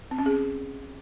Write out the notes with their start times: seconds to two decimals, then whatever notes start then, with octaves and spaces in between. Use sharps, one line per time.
0.11 C4
0.19 C#4
0.26 G#4